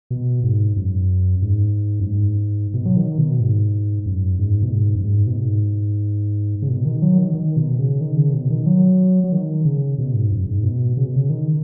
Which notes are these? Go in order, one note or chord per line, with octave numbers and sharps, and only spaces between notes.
B2
G#2
F#2
G#2
F#2
G#2
B2
F#3
D#3
B2
G#2
F#2
G#2
B2
G#2
F#2
G#2
B2
G#2
C#3
B2
D#3
F#3
D#3
D#3
B2
C#3
D#3
C#3
B2
D#3
F#3
F#3
D#3
C#3
B2
G#2
F#2
G#2
B2
C#3
B2
C#3
D#3